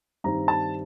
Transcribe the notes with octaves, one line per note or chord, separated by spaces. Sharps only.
G2 D#3 G3 C4 A#5
A5